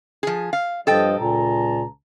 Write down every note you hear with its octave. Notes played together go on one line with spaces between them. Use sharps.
F3 G#4
F5
G2 F3 A4 D#5 G5
C#2 A#2 A5 A#5